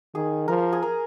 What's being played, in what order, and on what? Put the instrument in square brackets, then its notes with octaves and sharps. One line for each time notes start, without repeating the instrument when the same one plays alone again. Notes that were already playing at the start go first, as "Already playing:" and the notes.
[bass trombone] D#3 [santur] G#4
[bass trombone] F3 [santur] A#4
[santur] G#4
A#4